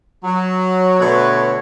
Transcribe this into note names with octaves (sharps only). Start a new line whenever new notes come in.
F#3
B2 D3 A3 F#4 B4 C#5